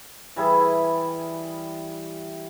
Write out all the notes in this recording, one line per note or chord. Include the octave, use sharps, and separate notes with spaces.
E3 G3 E4 G#4